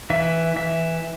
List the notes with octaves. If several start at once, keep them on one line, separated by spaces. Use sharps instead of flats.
E3 E5
E3 E5